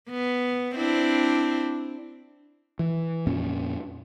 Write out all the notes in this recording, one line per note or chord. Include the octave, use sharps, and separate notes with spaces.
B3
C4 D4 E4
E3
F2 A#2 C#4